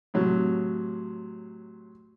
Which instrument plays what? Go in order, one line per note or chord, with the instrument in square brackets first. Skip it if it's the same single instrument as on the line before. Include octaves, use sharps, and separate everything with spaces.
[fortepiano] A2 C3 F#3